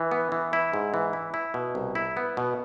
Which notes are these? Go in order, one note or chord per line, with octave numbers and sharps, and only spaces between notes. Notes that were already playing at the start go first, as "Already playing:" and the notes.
Already playing: E3
B3
E3
E4
G#2
E3
E4
E4
B2
C2
E4
B3
B2